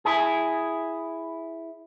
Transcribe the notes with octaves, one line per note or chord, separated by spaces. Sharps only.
E4 G#4